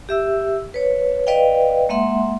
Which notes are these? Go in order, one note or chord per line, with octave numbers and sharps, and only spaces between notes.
G4 E5 E6
B4 C#5
B4 D5 D#5 F5 G5
G#3 A#3 E5 F#5 C6